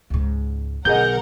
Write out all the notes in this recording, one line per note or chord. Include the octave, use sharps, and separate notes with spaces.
C#2 G#2
B1 D3 G#4 A#4 D#5 F#5 G6